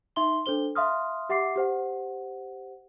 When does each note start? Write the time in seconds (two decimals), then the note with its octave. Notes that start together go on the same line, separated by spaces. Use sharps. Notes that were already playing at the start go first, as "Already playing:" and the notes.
0.16 D#4 E5 C6 G7
0.46 D4 A4 C5 G7
0.75 E5 F5 C6 D#6 F6
1.29 G4 E5 F#5 D6 C7
1.56 G4 C5 F#5